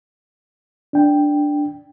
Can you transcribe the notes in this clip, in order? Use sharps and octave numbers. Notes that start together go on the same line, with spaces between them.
D4 G5